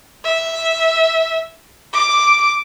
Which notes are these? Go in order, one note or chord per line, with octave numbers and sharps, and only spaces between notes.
E5
D6